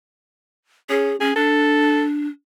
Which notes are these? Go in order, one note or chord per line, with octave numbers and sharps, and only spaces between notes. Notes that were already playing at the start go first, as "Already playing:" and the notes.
C#4 G#4
C#4 G#4
D4 A4